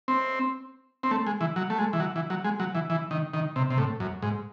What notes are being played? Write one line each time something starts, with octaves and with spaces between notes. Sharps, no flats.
C4
C4
A3
G#3
E3
F#3
A3
G#3
E3
F#3
E3
F#3
G#3
F#3
E3
E3
D#3
D#3
C3
C3
A2
F#2
G#2